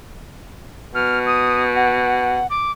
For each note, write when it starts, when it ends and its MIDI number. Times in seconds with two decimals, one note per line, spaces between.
0.95 2.41 47
0.95 1.19 89
1.26 1.62 87
1.76 2.47 78
2.50 2.71 86